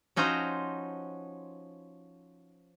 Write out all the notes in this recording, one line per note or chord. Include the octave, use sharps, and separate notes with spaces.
F3 C#4 D#4 F#4 C5 A#5